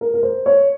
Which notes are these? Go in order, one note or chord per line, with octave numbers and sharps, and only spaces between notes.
A#4
A#4
C5
C#5